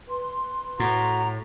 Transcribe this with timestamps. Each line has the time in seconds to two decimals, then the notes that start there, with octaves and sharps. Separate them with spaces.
0.07 B4 C6
0.80 A2 F#4 A#5